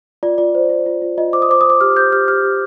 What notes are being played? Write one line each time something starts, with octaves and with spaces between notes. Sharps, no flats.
F4 D5
F4 D5
C5
F4
F4
F4
F4 D#5
C5 D6
D#6
C5 D6
D#6
C5 D6
G4 F6
C5 G6
G4 F6
G4 F6
G4